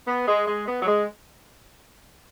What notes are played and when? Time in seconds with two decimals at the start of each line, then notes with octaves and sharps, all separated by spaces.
0.07 B3
0.26 G#3
0.47 G#3
0.66 B3
0.82 F#3
0.86 G#3